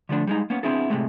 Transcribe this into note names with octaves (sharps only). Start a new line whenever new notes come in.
D3 F3 A3 D4
G3 G#3 D#4
A#3 B3 C#4
B3 C4 D4 E4 G#4 A4
A2 C3 E3 F3 G#3 A3